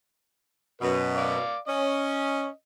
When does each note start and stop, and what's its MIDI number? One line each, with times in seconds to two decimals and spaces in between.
0.82 1.38 42
0.82 1.38 47
0.82 1.12 71
1.16 1.57 74
1.16 1.57 77
1.16 1.57 86
1.67 2.47 61
1.67 2.51 75